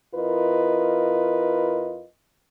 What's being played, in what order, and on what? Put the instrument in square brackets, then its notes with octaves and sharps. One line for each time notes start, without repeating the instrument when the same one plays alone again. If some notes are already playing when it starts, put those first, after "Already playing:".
[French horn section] F2 E4 F4 A#4 B4 D#5